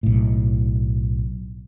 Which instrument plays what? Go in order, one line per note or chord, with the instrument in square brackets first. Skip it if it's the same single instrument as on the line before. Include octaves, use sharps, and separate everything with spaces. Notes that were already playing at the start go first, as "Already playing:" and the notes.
[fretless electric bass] B1 A2